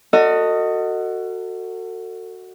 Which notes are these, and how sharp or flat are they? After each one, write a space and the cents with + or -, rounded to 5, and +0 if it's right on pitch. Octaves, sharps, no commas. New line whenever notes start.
F#4 +0 A4 +40 D#5 +0